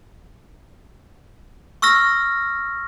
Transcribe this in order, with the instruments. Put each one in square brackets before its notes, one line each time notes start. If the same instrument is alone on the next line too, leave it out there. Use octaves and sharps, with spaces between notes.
[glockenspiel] C#6 E6 F6 A#6